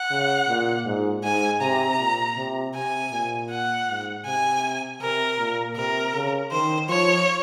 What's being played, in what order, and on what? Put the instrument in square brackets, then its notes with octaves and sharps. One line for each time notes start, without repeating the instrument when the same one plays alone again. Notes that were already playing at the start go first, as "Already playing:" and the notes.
Already playing: [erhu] F#5
[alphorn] C#3
A#2
G#2
[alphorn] G#2 [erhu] G#5
[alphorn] C3 [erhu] A#5
[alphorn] A#2
C3
[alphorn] C3 [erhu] G#5
[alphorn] A#2
[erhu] F#5
[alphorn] G#2
[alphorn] C3 [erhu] G#5
[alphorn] C3 [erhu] A#4
[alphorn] A#2
[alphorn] C3 [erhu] A#4
[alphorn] C#3
[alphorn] D#3 [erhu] C5
[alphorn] F3 [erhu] C#5